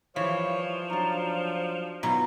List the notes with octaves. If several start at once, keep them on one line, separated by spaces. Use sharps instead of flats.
E3 F3 G3 C#5 F5
F#3 D4 D#4
B2 F#3 D#4 F4 A#5